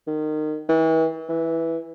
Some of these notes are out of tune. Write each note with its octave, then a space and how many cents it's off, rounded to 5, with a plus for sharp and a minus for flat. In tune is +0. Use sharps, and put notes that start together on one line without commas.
D#3 -25
E3 -35
E3 -5